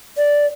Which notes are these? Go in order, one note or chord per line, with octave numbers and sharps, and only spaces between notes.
D5